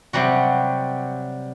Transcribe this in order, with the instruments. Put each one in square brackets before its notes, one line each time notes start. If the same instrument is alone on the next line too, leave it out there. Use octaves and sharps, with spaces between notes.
[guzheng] C3 F#3 G3 F#4